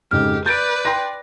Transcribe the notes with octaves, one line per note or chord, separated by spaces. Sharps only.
F2 G#2 C#3 G4 F6
B4 D5 G6 A6 D7
G5 C6 A#6